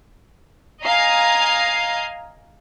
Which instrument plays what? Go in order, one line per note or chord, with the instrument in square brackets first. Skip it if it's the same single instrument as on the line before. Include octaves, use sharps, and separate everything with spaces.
[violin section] D#5 F5 G#5 A#5 C7